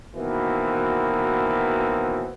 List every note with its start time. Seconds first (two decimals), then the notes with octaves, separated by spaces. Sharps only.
0.15 B2 D#3 E3 F#3 A#3 C4